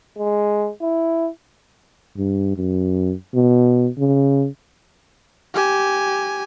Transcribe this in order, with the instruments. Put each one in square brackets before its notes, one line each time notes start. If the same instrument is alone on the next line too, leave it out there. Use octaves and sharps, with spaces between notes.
[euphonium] G#3
E4
[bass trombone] G2
F#2
B2
C#3
[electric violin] G4 G#5